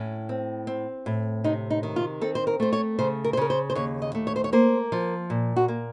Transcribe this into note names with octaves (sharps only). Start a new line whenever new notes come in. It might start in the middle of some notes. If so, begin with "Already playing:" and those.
Already playing: A2 C#4
C4
C4
A2
C3 D#4
D#4
D#3
F4
C4 A4
C5
A#4
A3 C5
C#5
C#3 C5
A#4
C5
C#3 A#4
C5
C5
D#2 C#5
D#5
A3
C#5
C5
C#5
A#3 C5
F3
A#2
F#4
A#3